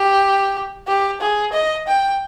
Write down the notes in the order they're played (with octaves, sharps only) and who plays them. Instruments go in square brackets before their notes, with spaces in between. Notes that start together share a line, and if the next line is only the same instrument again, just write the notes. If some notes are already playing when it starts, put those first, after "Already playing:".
Already playing: [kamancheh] G4
G4
G#4
D#5
G5